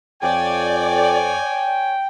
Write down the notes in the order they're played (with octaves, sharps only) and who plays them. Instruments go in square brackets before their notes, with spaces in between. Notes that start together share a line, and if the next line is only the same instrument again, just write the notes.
[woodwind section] F2 [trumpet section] C#5 G#5 [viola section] D5 [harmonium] G5